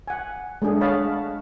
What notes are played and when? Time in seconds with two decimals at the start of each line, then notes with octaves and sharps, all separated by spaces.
0.08 F#5 G#5
0.62 G#3 A3 D4 G#4
0.81 C#5 D#5 F5 F#5 A5 B5